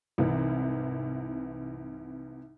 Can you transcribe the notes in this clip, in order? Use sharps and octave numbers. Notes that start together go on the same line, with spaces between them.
C2 G#2 C3 E3